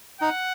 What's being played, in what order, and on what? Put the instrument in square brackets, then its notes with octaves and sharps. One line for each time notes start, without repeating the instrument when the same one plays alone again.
[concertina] D#4 [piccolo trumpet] F#5